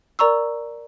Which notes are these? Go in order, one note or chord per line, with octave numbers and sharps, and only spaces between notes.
A#4 D5 A#5 C#6 E6